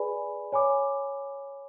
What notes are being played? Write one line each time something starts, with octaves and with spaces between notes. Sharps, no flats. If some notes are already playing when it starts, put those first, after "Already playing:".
Already playing: G#4 B4 D5 G#5 B5
C#5 G#5 B5 D6